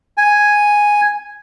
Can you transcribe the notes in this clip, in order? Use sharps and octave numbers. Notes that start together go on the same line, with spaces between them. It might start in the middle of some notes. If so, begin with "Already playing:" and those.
G#5